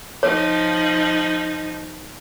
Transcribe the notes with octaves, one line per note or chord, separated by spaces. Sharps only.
F3 D#4 C#5